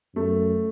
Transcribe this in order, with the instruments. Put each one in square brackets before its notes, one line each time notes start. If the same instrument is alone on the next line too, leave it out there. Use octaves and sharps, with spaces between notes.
[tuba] F#2 [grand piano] A3